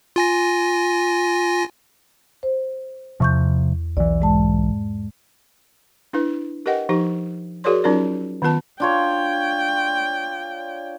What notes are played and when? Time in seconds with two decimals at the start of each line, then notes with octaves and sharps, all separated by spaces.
0.16 F4 G#5 A#6
2.43 C5
3.20 E2 C3 F3 C#6 G6
3.97 B1 E3 D5
4.21 G#2 G#3 A5
6.13 D4 E4 B4
6.66 G4 A#4 B4 D#5 F#5 G5
6.89 F3 D#4 G4
7.64 F#4 G#4 A#4 C#5 D5 C6
7.84 F#3 C#4 D#4 F4 A#4 D5
8.42 D#3 B3 F4 B4 A5
8.80 D4 F4 C#5 G5